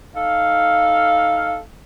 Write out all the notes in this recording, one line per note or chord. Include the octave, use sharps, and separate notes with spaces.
D#4 A4 F5